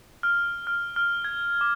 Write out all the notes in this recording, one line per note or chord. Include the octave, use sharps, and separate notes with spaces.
F6
F6
F6
G#6
D6